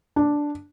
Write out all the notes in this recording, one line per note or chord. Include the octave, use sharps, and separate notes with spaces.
D4